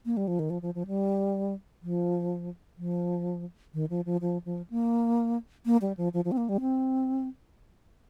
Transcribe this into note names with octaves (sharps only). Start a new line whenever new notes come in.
A#3
G3
F3
D#3
F3
F3
F3
G3
F3
F3
D#3
F3
F3
F3
F3
A#3
A#3
G3
F3
F3
F3
C4
A#3
G3
C4